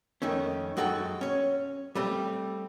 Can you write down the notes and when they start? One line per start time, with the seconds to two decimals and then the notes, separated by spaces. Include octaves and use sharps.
0.22 F2 D#3 A3 C#4
0.77 F#2 G#3 F#4 A4 G5
1.21 C#4 C#5
1.95 G3 A3 C4